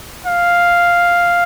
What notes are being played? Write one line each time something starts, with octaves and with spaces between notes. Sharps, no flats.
F5